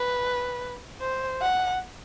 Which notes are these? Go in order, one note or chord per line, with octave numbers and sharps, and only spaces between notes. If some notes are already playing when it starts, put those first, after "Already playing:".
Already playing: B4
C5
F#5